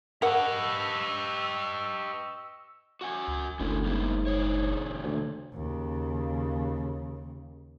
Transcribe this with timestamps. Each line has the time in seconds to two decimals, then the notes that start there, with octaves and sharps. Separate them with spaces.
0.22 G4 A#4 B4 D#5 F#5 C#6 E6
3.01 F#4 F#5 G#5
3.28 C#2
3.60 F#1 D2 D#3 C#4 E4
3.86 G#2 G3 A#3 B3
4.27 A#2 C#3 C#5
5.03 D2
5.53 D#2 C#3